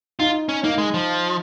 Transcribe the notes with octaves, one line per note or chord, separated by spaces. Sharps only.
D#4 F4
C#4
A#3 D#4
G#3
F3